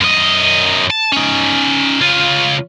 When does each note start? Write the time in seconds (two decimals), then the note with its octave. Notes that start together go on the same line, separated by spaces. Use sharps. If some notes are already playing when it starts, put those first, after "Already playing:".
0.01 F#2 D#5
0.90 A5
1.13 C#4 D#4
2.00 C#3 F4